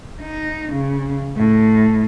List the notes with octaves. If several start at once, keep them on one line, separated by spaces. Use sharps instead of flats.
D#4
C#3
A2